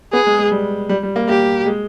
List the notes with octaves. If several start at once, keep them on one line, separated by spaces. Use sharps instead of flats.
B3 G#4
G#3
G#3
G3
G3
G3
A#3
A#3 G4
G#3